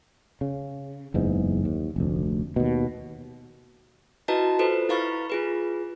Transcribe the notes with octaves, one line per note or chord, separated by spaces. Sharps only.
C#3
F#1 E2 G#2
D#2
F1 D2
D#2 B2
E4 F#4 B4 D#5 A5 A#5
F4 A4 B4 C5
E4 B4 F5 B5 C#6 A6
F4 G#4 B4